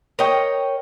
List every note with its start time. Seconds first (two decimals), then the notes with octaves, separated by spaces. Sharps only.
0.19 A#4 C#5 D#5 G5